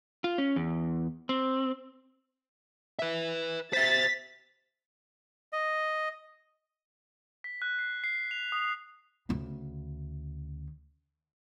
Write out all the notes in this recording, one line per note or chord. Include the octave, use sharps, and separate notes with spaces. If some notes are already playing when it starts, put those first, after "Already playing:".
F4
C#4
E2
C4
B4 E5
C5 E5 A6 B6
D#5
B6
F#6
C7
C7
F7
D#6
D2 C#3